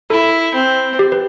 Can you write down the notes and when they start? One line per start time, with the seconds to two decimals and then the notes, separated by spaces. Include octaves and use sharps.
0.10 E4 A4
0.55 C4
0.99 G4
1.12 B4